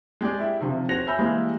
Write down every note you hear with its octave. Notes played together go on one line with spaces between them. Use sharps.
G#3 G4 G#4 D5
E4 E5
C3 D#3 F3
F#4 C5 C#5 A#6 F7
E5 G#5 B5 E6 G6
E3 G3 G#3 A#3